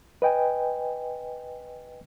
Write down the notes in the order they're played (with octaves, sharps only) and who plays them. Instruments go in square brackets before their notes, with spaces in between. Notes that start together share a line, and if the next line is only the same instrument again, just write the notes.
[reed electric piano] B4 D#5 G5 G#5